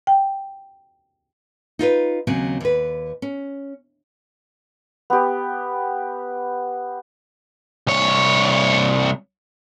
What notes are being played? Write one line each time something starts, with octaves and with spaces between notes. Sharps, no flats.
G5
D#4 F4 A#4 B4
D#2 C#3 F#3 C4
D#2 B4
C#4
B3 G4
C2 C#5